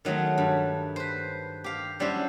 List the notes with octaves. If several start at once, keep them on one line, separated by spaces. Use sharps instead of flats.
D#3 F#3 G#3 A3
G2
B4 C5
G4 F5
F#3 G3 C#4 D4 E4 C5